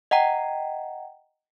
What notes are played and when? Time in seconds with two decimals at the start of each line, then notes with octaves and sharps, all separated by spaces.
0.11 D#5 F#5 G5 A#5